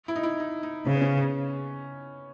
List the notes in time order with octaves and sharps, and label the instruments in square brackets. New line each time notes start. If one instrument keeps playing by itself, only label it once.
[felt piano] E4
D#4
E4
D#4
D#4
[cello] C#3 [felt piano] C#4
[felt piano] B3
C#4